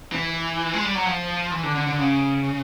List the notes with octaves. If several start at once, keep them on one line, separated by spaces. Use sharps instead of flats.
E3
G#3
G3
F#3
F3
E3
D3
D3
D3
C#3